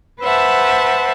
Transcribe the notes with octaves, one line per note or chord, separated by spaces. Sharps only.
B4 C5 E5 F#5 A5